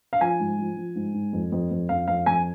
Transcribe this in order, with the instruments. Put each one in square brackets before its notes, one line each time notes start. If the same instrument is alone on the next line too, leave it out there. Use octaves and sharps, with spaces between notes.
[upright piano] F5
F3 G#5
G#2
F3
F3
G#2
G#2
F2
F2
F2
F2 F5
F2 F5
F2 G#5